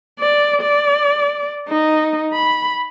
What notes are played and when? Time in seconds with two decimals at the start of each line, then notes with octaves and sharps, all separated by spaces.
0.20 D5
0.62 D5
1.69 D#4
2.34 B5